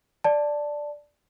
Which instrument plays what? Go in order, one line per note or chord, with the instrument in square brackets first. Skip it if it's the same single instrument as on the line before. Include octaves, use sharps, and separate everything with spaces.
[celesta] D5 A5